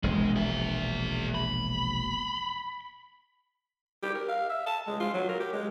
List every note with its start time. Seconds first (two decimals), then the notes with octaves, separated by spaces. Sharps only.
0.03 E1 A#1 G#3
0.36 G#4 E5
1.35 B5
4.03 G4
4.15 A#4
4.29 F5
4.49 E5
4.66 A5
4.87 G#3
5.00 F4
5.14 F#3
5.29 A#4
5.40 G4
5.53 G#3